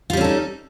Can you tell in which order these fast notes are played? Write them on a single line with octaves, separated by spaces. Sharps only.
F4 G3 C#4 A4 D#4